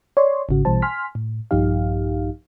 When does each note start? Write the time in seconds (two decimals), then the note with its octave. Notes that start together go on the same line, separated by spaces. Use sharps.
0.17 C#5 D5 C6
0.49 G#1 G#2 C#3 F#4
0.65 A#1 B2 E3 G3 C5 A5
0.82 G#5 C6 F6 B6
1.15 A2
1.51 A#1 G2 F3 D#4 G4 F5